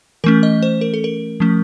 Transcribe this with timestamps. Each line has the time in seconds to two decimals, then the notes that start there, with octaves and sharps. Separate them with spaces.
0.24 E3 A3 C#4 A#4
0.43 D#5
0.62 C5
0.81 A#4
0.94 A4
1.04 A#4
1.40 F3 A3 C#4